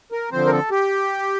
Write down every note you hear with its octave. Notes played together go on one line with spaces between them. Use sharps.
A#4
D3 F3 C4 C5
A#4
A4
G4